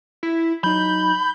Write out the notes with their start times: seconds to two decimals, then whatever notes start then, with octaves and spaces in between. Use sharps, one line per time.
0.23 E4
0.64 F#3 D#4 B5 G6